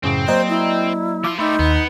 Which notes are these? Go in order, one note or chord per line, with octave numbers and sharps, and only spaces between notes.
F#2 A2 C#3 C4
F#3 A#3 C5 D5 D#5 A#5
E4
F3 C6 D6
G3 A3 D#4 B5 C6 E6
D#2 B3